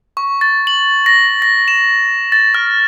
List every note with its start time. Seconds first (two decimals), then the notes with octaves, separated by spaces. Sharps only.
0.17 C#6
0.41 A6
0.67 F#7
1.06 A#6
1.42 A#6
1.68 E7
2.32 A6
2.54 F6